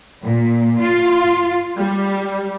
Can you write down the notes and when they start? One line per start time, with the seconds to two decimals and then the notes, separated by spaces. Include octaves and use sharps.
0.23 A#2
0.80 F4
1.77 G3